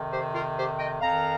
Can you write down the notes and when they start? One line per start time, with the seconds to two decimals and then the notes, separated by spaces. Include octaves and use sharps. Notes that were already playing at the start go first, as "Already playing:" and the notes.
Already playing: F2 C3 D#3
0.12 G4 C5
0.34 F4 A#4
0.57 G4 C5
0.79 D#5 G5
1.01 F2 D#3 F5 A#5